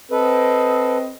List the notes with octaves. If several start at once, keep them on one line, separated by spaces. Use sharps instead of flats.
C4 A4 B4 D#5